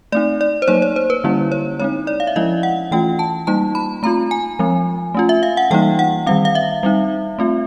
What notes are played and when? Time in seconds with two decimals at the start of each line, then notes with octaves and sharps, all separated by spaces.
0.12 A3 C4 D#4 D5
0.41 D5
0.62 C5
0.68 F#3 A#3 D#4 C#5
0.82 C#5
0.96 C5
1.10 B4
1.24 D3 G3 A#3 C#4 E4
1.52 C#5
1.80 G#3 C4 D#4 C#5
2.07 D5
2.20 F5
2.27 E5
2.36 F3 G#3 C#4 E4 D#5
2.63 F#5
2.91 E3 A3 C#4 F4 G5
3.19 A5
3.47 G3 A#3 D#4 A5
3.75 B5
4.03 A3 C4 F4 A#5
4.31 G#5
4.59 F3 G#3 C4
5.14 A3 C#4 F4
5.29 E5
5.43 F5
5.57 F#5
5.71 E3 G3 A#3 D#4 G5
5.99 F#5
6.27 D#3 G3 C4 F5
6.45 F5
6.55 E5
6.83 G3 C4 D#4
7.39 A3 C4 F4